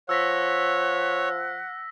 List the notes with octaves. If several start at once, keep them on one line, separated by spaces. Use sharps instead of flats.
F3 C#5 F#5 E6 A#6 B6